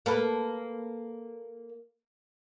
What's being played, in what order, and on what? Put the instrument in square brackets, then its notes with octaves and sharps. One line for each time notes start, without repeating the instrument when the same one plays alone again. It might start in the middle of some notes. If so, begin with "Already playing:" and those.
[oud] A#3 A4 B4